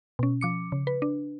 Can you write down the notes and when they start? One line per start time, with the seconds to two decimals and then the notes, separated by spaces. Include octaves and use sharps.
0.19 B2 C#4
0.41 F3 D6 C#7
0.72 C#3
0.87 B4
1.02 D4